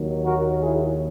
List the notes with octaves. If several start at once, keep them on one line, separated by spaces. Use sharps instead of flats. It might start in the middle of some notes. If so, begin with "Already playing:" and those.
Already playing: D#2 D#3 F#3
F#4 A#4
E4 G#4